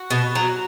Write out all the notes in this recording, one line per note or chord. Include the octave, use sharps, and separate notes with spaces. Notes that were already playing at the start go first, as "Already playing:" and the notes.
Already playing: F#4
B2
F#3